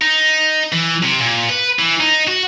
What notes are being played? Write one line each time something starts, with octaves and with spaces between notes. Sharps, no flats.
D#4
E3
C3
A#2
B4
E3
D#4
F#4